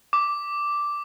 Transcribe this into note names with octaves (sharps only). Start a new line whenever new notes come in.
D6